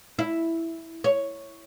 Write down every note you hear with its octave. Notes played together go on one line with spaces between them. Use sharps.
E4
C#5